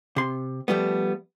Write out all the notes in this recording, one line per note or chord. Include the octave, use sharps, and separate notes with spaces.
C3 C6
F3 G3 A3 B3